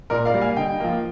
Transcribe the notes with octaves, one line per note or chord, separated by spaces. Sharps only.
A#2 A#4 D5
D5 F5
G3 A#3
F5 G#5
D3 D#5 G5
F3 A#3